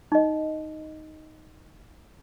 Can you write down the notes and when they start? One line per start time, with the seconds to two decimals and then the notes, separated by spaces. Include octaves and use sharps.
0.12 D#4 D#5